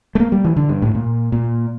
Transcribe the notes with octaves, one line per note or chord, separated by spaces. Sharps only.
A3
A#3
G3
E3
D3
G2
A2
A#2
A#2